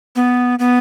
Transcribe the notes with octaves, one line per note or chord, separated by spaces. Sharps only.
B3
B3